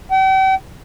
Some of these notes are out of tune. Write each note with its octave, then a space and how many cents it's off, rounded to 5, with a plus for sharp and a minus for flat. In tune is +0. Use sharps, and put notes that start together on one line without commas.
G5 -45